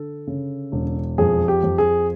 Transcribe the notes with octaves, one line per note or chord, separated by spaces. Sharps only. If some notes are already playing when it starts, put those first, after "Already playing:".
Already playing: D3 A4
C#3
E1
F2 G#4
G4
F2
G#4